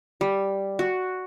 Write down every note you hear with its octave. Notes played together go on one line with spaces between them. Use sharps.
G3
F#4